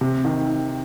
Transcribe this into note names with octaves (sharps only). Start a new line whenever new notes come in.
C3
D#3